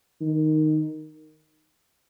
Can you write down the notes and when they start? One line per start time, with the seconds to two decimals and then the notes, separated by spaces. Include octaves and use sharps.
0.21 D#3